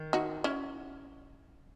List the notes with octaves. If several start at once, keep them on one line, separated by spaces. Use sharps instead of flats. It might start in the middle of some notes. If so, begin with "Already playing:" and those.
Already playing: D#3
D#4 F#4
C#4 E4